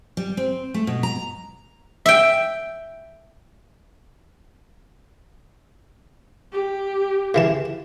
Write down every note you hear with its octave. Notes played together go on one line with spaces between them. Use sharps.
G3
C4
A3
B2
A#5
E5 G5
G4
C#3 E3 A5